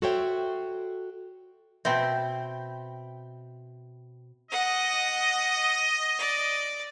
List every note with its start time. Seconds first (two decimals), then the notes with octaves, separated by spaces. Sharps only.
0.02 F#4 A4 C5 C#5 E5 G5
1.85 B2 C4 E5 G5 B5
4.51 D#5 F#5
6.19 D5